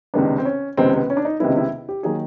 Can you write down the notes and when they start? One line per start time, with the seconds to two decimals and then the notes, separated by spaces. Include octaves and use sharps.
0.14 C#2 C3 D#3 G#3 B3 D4
0.38 C4
0.45 C#4
0.77 C#2 C3 D#3 G#3 B3 C4
0.94 B3
1.10 C#4
1.17 D4
1.25 D#4
1.40 C#2 C3 D#3 G#3 B3 E4
1.57 E4
1.89 G4
2.03 D#3 F#3 A#3 G#4